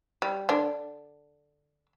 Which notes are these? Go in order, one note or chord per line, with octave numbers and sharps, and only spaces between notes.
G3
D3 D4